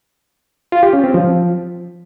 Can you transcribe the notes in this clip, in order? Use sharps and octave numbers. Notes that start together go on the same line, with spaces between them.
F4
G4
C#4
C4
F3